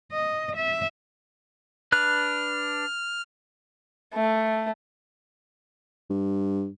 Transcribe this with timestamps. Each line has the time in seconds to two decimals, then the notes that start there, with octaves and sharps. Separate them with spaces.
0.12 D#5
0.56 E5
1.92 D4 B4 F6 F#6
4.14 A3
6.10 G2